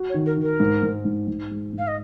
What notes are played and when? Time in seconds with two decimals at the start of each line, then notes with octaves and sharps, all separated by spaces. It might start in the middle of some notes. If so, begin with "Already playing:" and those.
Already playing: F#4
0.09 C#5
0.14 D#3
0.26 A#4
0.37 D#3
0.42 A#4
0.60 G#2
0.83 G#2
1.05 G#2
1.28 G#2
1.51 G#3
1.73 G#2
1.78 F5
1.88 D#5